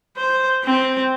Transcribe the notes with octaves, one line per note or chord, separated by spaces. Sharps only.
C5
C4